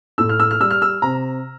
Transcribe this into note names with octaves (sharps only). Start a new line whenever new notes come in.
A2 E6
F6
E6
F6
G3 E6
F6
E6
C3 A#5